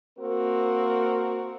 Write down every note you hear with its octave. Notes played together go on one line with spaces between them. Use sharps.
A#3 C4 F#4 A#4